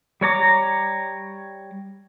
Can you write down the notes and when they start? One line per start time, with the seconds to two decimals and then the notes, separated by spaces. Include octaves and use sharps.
0.21 G3 C#5 A#5 D6